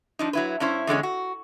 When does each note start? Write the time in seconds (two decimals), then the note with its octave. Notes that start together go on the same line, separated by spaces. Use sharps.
0.19 F3 D4 D#4
0.33 F#3 E4 B4
0.60 G2 C#4 E4 C5
0.87 E2 D3 G#3 C#4
1.03 F#4